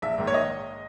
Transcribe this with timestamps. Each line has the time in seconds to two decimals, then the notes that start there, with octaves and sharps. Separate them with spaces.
0.02 A#1 E5
0.18 G#2 D#3 A#3
0.27 C#5
0.34 D#5